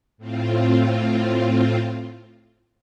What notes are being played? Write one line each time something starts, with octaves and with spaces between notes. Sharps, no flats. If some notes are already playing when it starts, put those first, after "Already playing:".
A2 C4 F4